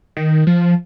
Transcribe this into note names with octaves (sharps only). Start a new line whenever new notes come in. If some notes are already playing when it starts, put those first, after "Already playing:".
D#3
F3